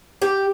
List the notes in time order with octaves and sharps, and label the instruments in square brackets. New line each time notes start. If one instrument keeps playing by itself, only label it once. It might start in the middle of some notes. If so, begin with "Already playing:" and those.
[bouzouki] G4